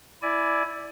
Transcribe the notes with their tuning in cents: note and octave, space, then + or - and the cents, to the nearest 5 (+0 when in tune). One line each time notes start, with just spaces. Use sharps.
E4 +0 D5 +0 G#5 +25